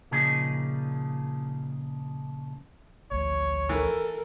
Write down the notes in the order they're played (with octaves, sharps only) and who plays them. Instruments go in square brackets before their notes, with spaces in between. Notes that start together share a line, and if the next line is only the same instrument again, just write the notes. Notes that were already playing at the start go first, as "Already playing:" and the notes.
[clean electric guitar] A#2 C#3 F3 D#4 G#4
[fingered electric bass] A1 D2 F3 [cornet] C#5
[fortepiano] E3 [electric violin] A4 A#4